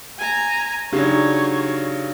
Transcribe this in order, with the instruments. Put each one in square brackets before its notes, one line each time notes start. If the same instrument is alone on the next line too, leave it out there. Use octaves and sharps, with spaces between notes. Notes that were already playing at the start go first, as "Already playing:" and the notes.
[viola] G#5 A#5
[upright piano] C#3 F#3 [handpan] D4 D#4 G4 [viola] C#5